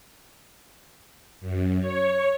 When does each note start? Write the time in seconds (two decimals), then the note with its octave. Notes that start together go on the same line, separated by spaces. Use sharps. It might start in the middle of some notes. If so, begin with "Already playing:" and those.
1.41 F#2
1.81 C#5